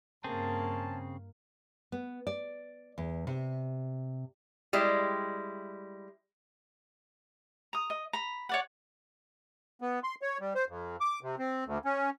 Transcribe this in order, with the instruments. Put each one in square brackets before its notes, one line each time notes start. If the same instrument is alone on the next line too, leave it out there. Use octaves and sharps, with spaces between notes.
[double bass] G2 [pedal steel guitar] C#3 C4 G#4 [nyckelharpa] A#3 [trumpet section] C#4 A5
[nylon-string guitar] B3
D5
E2
C3
[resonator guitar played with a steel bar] G3 G#3 E4
[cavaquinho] A#5 D#6
D#5
A#5 B5
C#5 D5 F#5
[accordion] B3
C6
C#5
G3
C5
F2
D6
C3
C4
D2
C#4